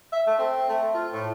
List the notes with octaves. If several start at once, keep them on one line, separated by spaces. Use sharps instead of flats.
E5
A3
C4
A3
F4
A2